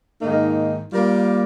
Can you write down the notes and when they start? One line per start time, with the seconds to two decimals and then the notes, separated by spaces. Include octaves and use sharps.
0.21 G#2 D#3 A#3 D#4
0.93 G3 A#3 F4 A#4